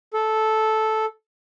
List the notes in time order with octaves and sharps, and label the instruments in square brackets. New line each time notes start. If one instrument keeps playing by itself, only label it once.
[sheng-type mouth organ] A4